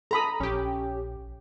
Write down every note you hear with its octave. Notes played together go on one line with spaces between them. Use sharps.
A4 A#5 B5 D#6
A#1 C#4 G4